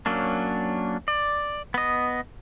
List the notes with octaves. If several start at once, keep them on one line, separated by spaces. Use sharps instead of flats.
F#3 A#3 C#4 D4
D5
B3 D#5